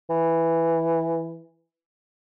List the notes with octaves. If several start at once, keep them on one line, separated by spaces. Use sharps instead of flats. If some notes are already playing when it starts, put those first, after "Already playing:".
E3